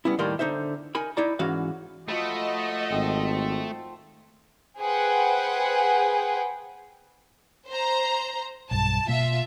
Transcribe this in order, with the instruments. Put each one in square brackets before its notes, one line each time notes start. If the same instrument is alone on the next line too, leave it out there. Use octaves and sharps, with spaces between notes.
[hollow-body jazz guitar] G3 B3 C#4 E4
D#2 A2 G3 A#4 C6
D3 D#4 C5 E5
D#4 A#4 G#5 B5
D#4 E4 D5 A#5
G#2 E3 C#4 F#4 F5
[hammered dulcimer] F3 F#4 B5 [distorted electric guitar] A3 [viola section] D#5
[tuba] G#1 [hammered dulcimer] A4 C5 G5
[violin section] G#4 B4 C5 F#5 G5
C5 A#5
[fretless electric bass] B1 G2 [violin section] A5
[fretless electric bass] B2 A#3 [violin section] F4 E5